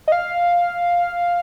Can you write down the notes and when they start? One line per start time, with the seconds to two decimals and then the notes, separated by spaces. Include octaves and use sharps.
0.08 D#5
0.12 F5